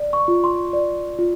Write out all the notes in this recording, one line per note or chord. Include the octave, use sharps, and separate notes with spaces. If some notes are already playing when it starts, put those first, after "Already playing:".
Already playing: D5
C#6
F4
C6
D5
F4